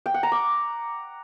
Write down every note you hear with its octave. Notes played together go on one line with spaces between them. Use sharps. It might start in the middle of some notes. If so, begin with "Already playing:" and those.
G5
F#5
A#5
D6